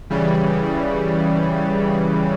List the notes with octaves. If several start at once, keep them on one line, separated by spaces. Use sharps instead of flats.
C#3 E3 G3